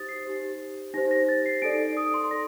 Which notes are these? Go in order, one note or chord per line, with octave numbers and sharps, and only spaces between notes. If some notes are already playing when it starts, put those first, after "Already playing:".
Already playing: D#4 G4 C5 D#6 A6
C7
D#4 G4 C5
D#4 G4 C5 A#6
A#6
A6
C7
D#4 A4 D5 D7
D#6
C6
A4 D5 A#6